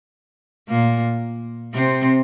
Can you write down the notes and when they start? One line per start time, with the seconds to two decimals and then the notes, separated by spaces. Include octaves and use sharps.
0.69 A#2 A#3
1.74 C3 C4